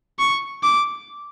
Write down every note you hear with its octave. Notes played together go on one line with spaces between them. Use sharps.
C#6
D6